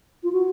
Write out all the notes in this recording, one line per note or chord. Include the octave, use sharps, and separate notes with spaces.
F4
F#4